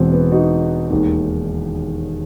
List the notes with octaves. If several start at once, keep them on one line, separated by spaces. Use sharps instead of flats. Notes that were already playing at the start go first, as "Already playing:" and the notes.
Already playing: E1 E2 B2 C4
B3
D#4 F#4
E1 D#2 D#3